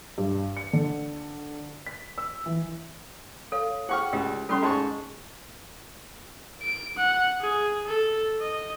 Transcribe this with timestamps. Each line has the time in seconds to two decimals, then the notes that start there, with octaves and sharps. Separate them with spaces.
0.18 G2
0.57 C#7
0.73 D3
1.86 B6
2.18 E6
2.46 E3
3.52 A4 C#5 F5
3.89 G#4 F#5 G5 C#6 F6
4.13 C#2 G4
4.49 G3 C#4 A4 C6
4.63 G#2 A5 C#6
6.62 D7
6.97 F#5
7.41 G#4
7.87 A4
8.41 D#5